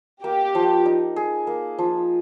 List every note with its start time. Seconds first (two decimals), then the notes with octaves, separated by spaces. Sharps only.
0.24 A#3 G4
0.55 F3
0.86 D#4
1.16 G#4
1.47 A#3
1.78 F3